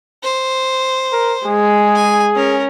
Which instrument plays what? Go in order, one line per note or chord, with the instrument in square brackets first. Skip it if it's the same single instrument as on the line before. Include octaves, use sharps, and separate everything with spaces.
[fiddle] C5
[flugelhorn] A#4
[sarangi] G#3 [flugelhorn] G#4
[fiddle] G#5
[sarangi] C#4 [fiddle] A#4